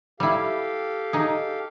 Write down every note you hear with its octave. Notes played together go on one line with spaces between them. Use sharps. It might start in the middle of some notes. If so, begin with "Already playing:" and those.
G3 E4 G4 A4 F5
D#4 G#4